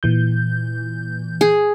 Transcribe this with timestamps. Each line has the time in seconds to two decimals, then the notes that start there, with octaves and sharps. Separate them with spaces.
0.03 A#2 E3 G6
1.41 G#4